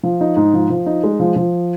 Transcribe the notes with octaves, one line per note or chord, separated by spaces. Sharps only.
F3
D#4
G#2
F3
F3
D#4
G#3
F3
F3